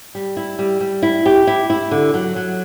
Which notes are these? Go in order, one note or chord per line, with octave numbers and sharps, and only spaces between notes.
G3
E4
G3
G3
E4
G4
E4
E4
D3
F#3
F#3